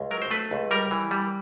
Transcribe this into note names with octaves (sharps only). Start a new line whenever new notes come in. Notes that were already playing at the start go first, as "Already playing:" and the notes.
Already playing: C#2
F#3 A#4
C5
A3 B4
C#2
G3 A#4
E3
G3